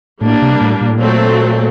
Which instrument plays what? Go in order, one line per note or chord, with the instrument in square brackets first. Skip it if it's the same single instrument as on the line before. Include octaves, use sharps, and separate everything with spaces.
[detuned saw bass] A2 [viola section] G3 A#3 D4
[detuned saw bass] C3
A2
A#2
A2
[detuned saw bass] A#2 [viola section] F#3 A3 C4